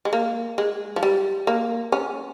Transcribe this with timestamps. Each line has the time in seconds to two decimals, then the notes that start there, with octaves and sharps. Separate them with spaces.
0.05 G#3
0.13 A#3
0.58 G#3
0.96 F3
1.03 G3
1.47 A#3
1.92 C#4